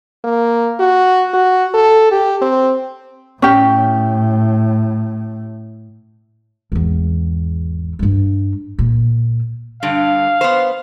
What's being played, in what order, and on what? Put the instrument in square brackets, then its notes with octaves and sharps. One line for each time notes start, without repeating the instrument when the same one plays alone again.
[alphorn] A#3
F#4
F#4
A4
G4
C4
[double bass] A2 [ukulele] C#4 G4
[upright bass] G#1 E2
G2 G3
A#2
[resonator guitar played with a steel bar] G2 D3 [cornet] F5
[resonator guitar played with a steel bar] B3 C5